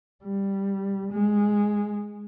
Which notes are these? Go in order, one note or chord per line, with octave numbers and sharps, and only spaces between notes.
G3
G#3